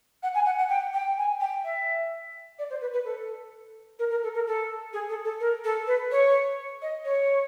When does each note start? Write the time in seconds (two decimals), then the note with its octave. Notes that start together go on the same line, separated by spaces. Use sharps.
0.23 F#5
0.35 G#5
0.46 F#5
0.58 F#5
0.69 G5
0.94 G5
1.17 G#5
1.40 G5
1.64 E5
2.59 D5
2.70 C5
2.81 B4
2.93 B4
3.05 A4
3.99 A#4
4.10 A#4
4.23 A4
4.35 A#4
4.47 A4
4.93 G#4
5.09 A4
5.24 A4
5.40 A#4
5.64 A4
5.87 B4
6.11 C#5
6.82 D#5
7.05 C#5